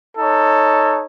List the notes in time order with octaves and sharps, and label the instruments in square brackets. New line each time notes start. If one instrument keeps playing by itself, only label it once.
[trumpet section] D#4 A4 C#5